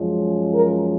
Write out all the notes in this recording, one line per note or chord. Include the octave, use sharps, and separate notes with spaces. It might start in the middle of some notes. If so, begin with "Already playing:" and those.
Already playing: F#2 F3 G#3 C#4
A#4